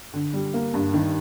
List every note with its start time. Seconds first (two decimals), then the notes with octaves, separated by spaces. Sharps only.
0.14 D3
0.33 G3
0.54 A#3
0.74 G2
0.94 D#3